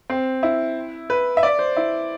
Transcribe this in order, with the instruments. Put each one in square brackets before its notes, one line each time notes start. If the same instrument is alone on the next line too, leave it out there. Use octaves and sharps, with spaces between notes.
[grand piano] C4
E4
B4
E5
D5
C5
E4